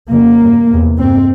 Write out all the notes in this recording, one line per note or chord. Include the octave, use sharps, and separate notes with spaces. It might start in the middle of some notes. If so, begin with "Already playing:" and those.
F2 C#3 A#3
G2
E2 C3
G2 C4